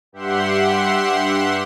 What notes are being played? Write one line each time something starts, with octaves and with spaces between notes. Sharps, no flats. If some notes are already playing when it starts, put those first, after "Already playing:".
G2 G4 E5 F#5 C6